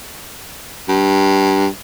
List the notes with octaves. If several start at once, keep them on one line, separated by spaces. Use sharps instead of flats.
G2